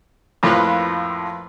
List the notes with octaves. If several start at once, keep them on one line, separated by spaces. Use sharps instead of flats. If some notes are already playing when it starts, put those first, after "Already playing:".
F2 A2 A#3 F4 B4